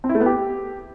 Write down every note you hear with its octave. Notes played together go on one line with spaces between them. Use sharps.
C4
E4
A3
B3
G4